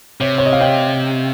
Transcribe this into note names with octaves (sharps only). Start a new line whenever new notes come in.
C3 C#5
C#5
D#5
F5
D#5 G5